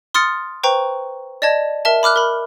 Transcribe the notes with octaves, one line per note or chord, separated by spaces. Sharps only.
C6 D#6 F6 A6 C#7
B4 C5 G5 A#5 C#6
D5 D#5 A5 G#6
A#4 E5 A5
B5 D6 F6 F#6
A#4 B5